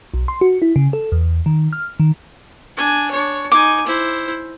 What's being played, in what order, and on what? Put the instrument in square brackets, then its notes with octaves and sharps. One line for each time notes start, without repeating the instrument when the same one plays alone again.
[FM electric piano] B1
C6
F#4
E4
C#3
A4
E2
D#3
F6
D#3
[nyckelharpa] D4 G#5
D4 C#5
[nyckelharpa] D#4 G#5 [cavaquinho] D6
[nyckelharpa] E4 C5